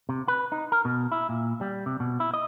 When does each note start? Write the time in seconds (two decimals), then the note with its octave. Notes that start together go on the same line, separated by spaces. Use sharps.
0.09 C3
0.28 B4
0.52 D#4
0.72 A#4
0.85 B2
1.12 E4
1.29 A#2
1.61 G3
1.86 C3
2.00 B2
2.20 E4
2.34 D#5